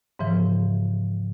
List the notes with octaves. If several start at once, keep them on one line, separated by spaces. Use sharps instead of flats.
G#2 C#3 E3 F3